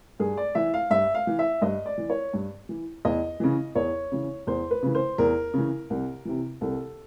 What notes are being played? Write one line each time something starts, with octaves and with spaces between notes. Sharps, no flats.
G2 G#4
D5
E3 E5
F5
G2 E5
F5
E3
E5
G2 D#5
D5
E3
C#5
G2
E3
E2 D#5
C#3 E3
E2 C#5
C#3 E3
E2 C5
B4
C#3 E3
C5
E2 A#4
C#3 E3
C2
C3 E3
C2 A4